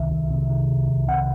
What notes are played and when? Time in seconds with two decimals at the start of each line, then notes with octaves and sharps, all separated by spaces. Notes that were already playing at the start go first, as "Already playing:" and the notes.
Already playing: C2 C3 D#3 E5
0.11 C2
0.30 C3
0.50 D#3
0.70 C2
0.89 C2
1.08 C3 F#5